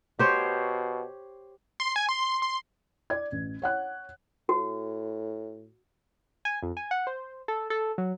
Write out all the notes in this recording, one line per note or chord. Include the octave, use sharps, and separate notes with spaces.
B2 G4 C5 C#5
C6
G#5
C6
C6
D5 G#6
A1
C#5 F#5 F#6
A2 F#4
G#5
F2
G#5
F#5
C5
A4
A4
F#3